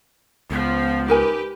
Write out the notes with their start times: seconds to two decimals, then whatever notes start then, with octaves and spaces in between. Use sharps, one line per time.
0.51 C#2 F3 B3
1.08 D#4 G4 A#4 B4 G#5